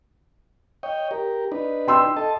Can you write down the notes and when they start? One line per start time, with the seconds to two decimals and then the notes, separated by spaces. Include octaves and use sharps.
0.83 C#5 D#5 G5
1.11 G4 A#4
1.52 D4 D#4 B4
1.87 G5 C6 E6
2.17 A4 D#5 A5